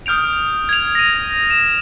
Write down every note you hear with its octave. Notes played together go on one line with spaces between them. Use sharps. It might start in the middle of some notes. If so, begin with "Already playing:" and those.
D#6 F6 G6 D7 F7
G#6 F7
A#6 D#7
E7